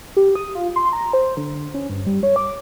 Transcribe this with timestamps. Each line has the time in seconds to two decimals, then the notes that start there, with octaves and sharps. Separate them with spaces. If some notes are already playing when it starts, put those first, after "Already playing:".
0.16 G4
0.35 D#6
0.55 F4
0.76 C6
0.93 A#5
1.13 C5
1.37 D3
1.74 C#4
1.90 G2
2.06 G3
2.23 C#5
2.36 D6